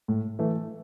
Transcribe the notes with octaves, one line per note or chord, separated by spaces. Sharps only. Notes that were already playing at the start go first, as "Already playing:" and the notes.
A2
E3 A3